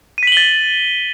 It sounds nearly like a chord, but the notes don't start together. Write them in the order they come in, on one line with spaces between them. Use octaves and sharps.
D#7 B6 F#7 G7 A6